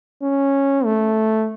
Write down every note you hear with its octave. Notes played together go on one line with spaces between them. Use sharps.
C#4
A3